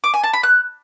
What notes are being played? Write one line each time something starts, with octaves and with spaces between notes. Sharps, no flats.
D6
G#5
A5
B5
F#6